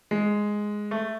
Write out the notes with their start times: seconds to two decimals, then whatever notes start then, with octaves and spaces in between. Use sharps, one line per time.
0.11 G#3
0.91 A3